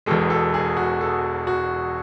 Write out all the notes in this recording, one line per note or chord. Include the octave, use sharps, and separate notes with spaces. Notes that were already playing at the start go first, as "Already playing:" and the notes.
E1 E2 B2 G#3 A4
A4
G#4
F#4
A4
F#4